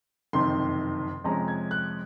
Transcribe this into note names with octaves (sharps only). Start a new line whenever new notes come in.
F#1 F2 C3 D#3 C6
F2 C3 F3 G#3 C#4 A#5
G#6
F#6